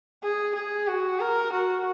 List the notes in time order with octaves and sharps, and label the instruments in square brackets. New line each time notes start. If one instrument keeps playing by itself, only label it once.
[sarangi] G#4
G#4
F#4
A#4
F#4